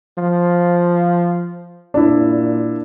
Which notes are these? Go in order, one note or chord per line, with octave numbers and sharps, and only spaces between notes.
F3
A#2 D4 E4